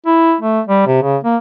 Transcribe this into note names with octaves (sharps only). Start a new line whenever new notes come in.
E4
A3
G3
C3
C#3
A#3